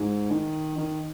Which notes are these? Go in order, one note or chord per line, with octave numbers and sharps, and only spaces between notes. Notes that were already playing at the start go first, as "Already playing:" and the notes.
Already playing: G#2
D#3
D#3